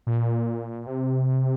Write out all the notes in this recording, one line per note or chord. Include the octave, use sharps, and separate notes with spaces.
A#2
C3